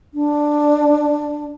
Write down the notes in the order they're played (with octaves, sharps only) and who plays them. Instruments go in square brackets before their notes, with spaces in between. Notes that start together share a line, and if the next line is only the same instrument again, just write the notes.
[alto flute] D4